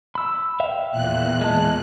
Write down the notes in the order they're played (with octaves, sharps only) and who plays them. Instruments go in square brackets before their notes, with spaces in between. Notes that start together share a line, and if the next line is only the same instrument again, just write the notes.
[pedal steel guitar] B5 E6
E5 F5 G5
[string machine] E2 A#2 F#6
[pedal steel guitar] G#3 A5